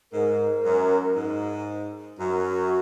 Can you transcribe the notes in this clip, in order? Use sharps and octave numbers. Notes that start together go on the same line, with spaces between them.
G#2 A#4
F#2
G#2
F#2 F#4